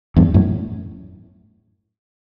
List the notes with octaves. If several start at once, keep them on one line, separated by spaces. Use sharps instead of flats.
E2 G2
F#2 A2